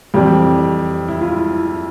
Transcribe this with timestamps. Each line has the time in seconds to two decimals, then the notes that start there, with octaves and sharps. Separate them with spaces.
0.14 F2 E3 G3 G4
1.08 E4
1.21 F4
1.33 E4